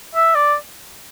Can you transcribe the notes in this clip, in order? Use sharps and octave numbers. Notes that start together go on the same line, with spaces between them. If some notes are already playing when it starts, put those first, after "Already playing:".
E5
D5